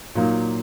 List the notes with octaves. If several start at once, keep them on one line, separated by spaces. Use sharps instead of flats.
A#2 F#3 A#3 D#4